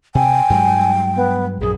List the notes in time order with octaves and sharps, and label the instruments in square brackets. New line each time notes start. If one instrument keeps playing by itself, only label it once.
[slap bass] C3 [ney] G5 [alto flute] G#5
[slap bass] G2 F#3 G#3
[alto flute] B3
[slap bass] A#1 F#2 [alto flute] G#4